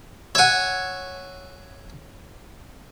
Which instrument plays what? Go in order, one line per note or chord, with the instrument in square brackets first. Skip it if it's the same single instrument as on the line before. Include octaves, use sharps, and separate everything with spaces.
[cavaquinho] C#5 F#5 [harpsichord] E5 G#5